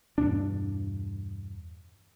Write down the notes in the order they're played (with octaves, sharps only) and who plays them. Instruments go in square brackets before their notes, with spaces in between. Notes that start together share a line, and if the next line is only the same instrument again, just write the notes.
[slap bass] E2 G2 B2 D4